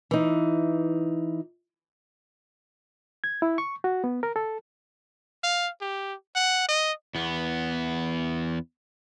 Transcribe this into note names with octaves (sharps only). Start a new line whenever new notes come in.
E3 D#4
G#6
E4
C#6
F#4
B3
A#4
A4
F5
G4
F#5
D#5
E2 B3